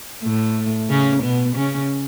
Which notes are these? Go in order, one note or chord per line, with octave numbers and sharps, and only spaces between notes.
A2 A3
C#3 C#4
B2 B3
C#3 C#4